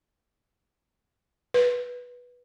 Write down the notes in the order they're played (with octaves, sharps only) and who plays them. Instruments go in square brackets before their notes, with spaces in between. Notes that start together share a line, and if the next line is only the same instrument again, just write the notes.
[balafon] B4